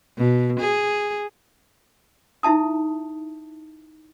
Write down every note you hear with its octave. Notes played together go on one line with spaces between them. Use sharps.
B2
G#4
D#4 E4 E5 A5 D#6